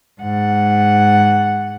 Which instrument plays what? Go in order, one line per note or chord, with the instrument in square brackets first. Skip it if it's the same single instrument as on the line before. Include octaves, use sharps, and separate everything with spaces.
[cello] G#2 F#5